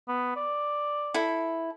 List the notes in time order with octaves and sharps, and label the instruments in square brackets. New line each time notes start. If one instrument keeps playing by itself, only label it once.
[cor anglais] B3
D5
[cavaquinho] E4 A4